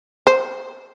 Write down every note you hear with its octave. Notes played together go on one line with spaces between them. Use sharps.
C5